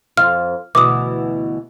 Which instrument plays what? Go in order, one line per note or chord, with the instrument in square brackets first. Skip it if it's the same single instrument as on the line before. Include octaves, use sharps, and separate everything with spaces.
[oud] F2 F4 [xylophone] F6
[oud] D2 B2 E3 [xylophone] D6 D#6